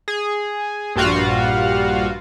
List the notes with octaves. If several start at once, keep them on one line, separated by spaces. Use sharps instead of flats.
G#4
A#1 G2 G3 F4 F#4 F5